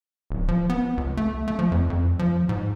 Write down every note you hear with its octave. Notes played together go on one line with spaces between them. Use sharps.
D1
F3
B3
C#2
A3
A3
F3
F2
F2
F3
G#2